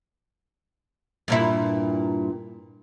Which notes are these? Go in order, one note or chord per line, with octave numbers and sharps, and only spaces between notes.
G2 A#2 E4